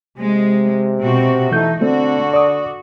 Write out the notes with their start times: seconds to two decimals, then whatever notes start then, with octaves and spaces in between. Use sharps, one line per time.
0.18 C3 G#3
1.00 B2 C4 F#4
1.52 E3 A3 D#4 G6
1.81 D3 A3 C4 F#4
2.34 D5 D6 D#6